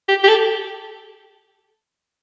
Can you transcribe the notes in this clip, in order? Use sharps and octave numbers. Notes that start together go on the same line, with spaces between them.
G4
G4
A4